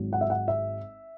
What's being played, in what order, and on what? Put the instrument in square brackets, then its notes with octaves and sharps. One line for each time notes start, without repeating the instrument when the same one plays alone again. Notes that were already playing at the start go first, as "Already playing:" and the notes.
Already playing: [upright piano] G#1 G#2 F#3
F#5
E5
F#5
E5